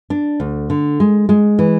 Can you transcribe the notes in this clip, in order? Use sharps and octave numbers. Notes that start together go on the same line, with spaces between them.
D4
D2
D3
G#3
G#3
E3